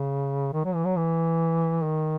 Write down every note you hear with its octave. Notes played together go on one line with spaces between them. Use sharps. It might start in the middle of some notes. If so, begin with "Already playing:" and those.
Already playing: C#3
D#3
F#3
E3
F#3
E3
D#3